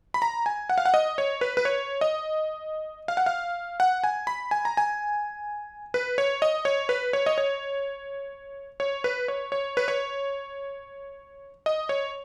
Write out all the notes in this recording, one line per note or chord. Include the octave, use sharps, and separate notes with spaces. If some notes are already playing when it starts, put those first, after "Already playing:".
B5
A#5
G#5
F#5
F5
F#5
D#5
C#5
B4
B4
C#5
D#5
F5
F#5
F5
F#5
G#5
B5
G#5
A#5
G#5
B4
C#5
D#5
C#5
B4
C#5
D#5
C#5
C#5
B4
C#5
C#5
B4
C#5
D#5
C#5